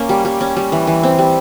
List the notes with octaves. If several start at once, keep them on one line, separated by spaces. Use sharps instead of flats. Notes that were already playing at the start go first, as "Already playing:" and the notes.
Already playing: A#3 C#4
G3
G3
C#4
G3
E3
E3
C4
G3